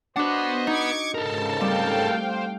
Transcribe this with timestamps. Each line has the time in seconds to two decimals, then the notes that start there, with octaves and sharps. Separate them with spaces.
0.16 D4 F#4 B4 C5 D#5 F#5
0.67 D#4 C#6 D6 G#6
1.14 G#2 C#3 A4 A#4 A5
1.61 G3 A3 C4 F5 G5
2.19 C5